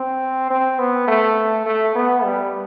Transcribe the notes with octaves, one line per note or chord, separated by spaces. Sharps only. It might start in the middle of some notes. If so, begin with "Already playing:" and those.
Already playing: C4
C4
B3
A3
A3
B3
G3